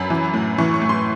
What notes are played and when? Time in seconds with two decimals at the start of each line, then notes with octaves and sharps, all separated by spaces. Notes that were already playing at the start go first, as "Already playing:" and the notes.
Already playing: F#2 B5
0.10 E3
0.34 A2
0.58 E3 C#6
0.74 C#6
0.82 A2
0.89 C6